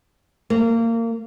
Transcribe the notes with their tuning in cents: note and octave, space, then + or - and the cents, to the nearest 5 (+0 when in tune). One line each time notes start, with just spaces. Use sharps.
A#3 -25